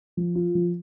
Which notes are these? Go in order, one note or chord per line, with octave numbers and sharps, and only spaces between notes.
F3
F4
F3